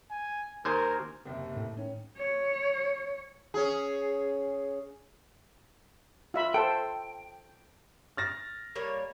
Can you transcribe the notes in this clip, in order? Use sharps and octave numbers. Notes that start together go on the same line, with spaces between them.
G#5
D#2 A#4 C5 G#5
F#1 D#2 C3
A2
D#3 C#4
C#5
C#4 G#4
F4 E5 B5
A4 C5 G5
F6 A6 A#6
G3 A#3 C#5